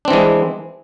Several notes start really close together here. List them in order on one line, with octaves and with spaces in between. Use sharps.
D4 C4 E3 G#3